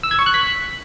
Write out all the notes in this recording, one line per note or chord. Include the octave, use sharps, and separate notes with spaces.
E6
G#6
C#6
F#6
B6